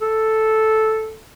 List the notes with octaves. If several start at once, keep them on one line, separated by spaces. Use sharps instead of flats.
A4